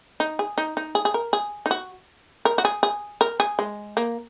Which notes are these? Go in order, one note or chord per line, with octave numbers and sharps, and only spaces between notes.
D#4
G#4
D#4
D#4
G#4
G#4
A#4
G#4
D#4
F#4
A#4
F#4
G#4
G#4
A#4
G#4
G#3
A#3